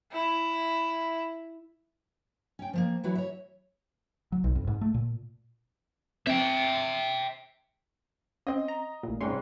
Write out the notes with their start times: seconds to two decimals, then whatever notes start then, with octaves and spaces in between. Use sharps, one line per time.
0.13 E4
2.59 C#4 G5
2.73 F3 A3 A#3
3.03 E3 F#3 E4 F#4 C#5
3.15 C#5 E5
4.32 F#3
4.44 B1
4.56 F2
4.67 G#2
4.81 A3
4.94 A#2
6.27 C4 E5 G5
8.47 C4 C#4 D#5
8.68 A#5
9.03 A1 A#2
9.21 G#2 C3 G3 C#4 C#5 C6